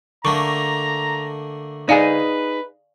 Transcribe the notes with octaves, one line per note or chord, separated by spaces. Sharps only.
D3 A3 A#3 A#5 C#6
D#4 G#4 B4 D5 F5 G#5